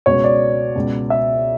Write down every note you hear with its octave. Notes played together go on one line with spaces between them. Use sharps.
C#2 B2 C#5
D5
C#2 B2
E5